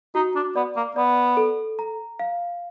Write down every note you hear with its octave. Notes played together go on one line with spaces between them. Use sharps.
D#4 F#4
D4
B3 D5
A#3
B3 D5
A4
A#5
F5